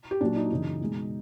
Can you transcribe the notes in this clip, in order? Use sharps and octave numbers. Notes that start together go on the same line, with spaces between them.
G4
A#2 F#3 D4
D#4
F#2 C#3 E3 D#4
B2 G#3